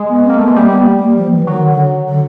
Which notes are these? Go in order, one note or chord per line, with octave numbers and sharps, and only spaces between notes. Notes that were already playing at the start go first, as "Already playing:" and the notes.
Already playing: G#3
B3
A#3 C4
A3 B3
G#3
G3 A#3
B3
A#3
A3
A#3
F3
E3
D#3 F#3
D3
D3